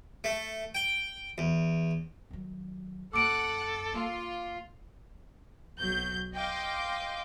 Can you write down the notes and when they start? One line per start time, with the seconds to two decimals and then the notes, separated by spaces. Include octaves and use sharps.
0.24 A3
0.75 G5
1.38 E2
2.31 D#3 F#3
3.13 F#2 A#3 A4 F#5 D6 F#6 D7
3.93 A#3 F4
5.77 B1 F#3 G6
6.34 D#5 F5 G5 C6 D6